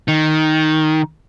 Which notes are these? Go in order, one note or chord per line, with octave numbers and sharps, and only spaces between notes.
D#3